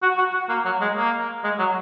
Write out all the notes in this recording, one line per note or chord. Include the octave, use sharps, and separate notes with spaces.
F#4
F#4
F#4
A#3
F#3
G#3
A#3
G#3
F#3